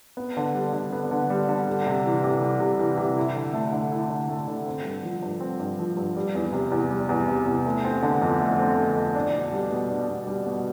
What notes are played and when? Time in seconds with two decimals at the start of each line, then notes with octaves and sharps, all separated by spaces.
0.17 B3
0.37 D3
0.54 G3
0.73 D3
0.92 B3
1.11 D3
1.30 G3
1.49 D3
1.68 G3
1.86 C3
2.05 E3
2.24 C3
2.42 G3
2.60 C3
2.80 E3
2.97 C3
3.17 E4
3.36 D3
3.53 A3
3.72 D3
3.92 E4
4.10 D3
4.29 A3
4.48 D3
4.66 C4
4.84 G2
5.03 F3
5.22 G2
5.40 C4
5.60 G2
5.79 F3
5.97 G2
6.16 G3
6.35 E2
6.53 C3
6.72 E2
6.91 G3
7.09 E2
7.28 C3
7.46 E2
7.66 A3
7.85 C4
8.02 D3
8.22 F2
8.40 A3
8.59 C4
8.77 D3
8.96 F2
9.15 D4
9.34 B2
9.52 G3
9.71 B2
9.90 D4
10.08 B2
10.27 G3
10.47 B2